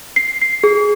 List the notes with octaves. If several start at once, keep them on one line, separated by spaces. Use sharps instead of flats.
C7
C7
G#4